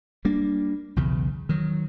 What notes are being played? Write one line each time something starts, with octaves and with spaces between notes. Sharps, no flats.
G3 A#3 D4
B1 E2 C#3
D#3 F#3